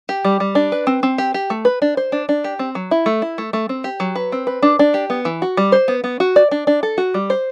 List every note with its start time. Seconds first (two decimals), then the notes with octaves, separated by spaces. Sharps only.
0.09 G4
0.25 G3
0.40 G3
0.55 D4
0.72 B4
0.87 C4
1.03 C4
1.18 G4
1.34 G4
1.50 A3
1.65 B4
1.82 D4
1.97 C5
2.12 D4
2.29 D4
2.44 G4
2.59 C4
2.75 F#3
2.91 E4
3.06 A3
3.22 E4
3.38 A3
3.53 A3
3.69 C4
3.84 G4
4.00 F#3
4.16 B4
4.32 C4
4.47 B4
4.63 D4
4.79 D4
4.94 G4
5.10 B3
5.25 E3
5.42 F#4
5.57 G3
5.72 C5
5.88 B3
6.04 B3
6.20 F#4
6.36 D5
6.51 D4
6.67 D4
6.83 A4
6.98 F#4
7.14 G3
7.30 C5